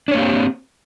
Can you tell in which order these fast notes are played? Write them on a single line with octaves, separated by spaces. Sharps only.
D4 C#5 A#3 G4 C4